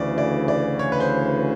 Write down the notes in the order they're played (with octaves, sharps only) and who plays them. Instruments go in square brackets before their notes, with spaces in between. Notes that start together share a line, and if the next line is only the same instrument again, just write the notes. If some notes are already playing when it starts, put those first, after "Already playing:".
Already playing: [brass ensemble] D2 C#3 E3 [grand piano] D5
[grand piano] D5
D5
C#5
B4
C5